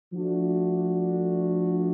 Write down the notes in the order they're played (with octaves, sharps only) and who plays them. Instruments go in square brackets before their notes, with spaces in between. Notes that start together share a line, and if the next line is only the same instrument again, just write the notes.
[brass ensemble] F3 A3 D4 F#4